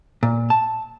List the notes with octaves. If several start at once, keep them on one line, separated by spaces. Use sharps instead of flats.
A#2
A5